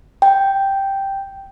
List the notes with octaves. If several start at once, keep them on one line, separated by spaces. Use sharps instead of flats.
G5